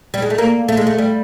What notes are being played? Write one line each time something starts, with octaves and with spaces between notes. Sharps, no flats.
G3
G#3
A3
A#3
A3
G#3
A3
G3